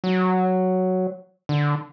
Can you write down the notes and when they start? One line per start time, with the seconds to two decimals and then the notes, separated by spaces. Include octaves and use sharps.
0.04 F#3
1.49 D3